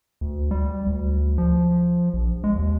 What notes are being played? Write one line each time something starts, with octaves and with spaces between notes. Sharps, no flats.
D2
G3
D2
F3
A#1
G#3
D#2